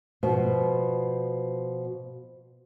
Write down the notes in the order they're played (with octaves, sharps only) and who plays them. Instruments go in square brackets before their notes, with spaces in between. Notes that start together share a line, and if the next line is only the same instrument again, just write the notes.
[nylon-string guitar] B2 F3 B3